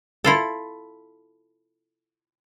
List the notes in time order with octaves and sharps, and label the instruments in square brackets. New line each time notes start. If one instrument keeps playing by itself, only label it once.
[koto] E4 F4 A4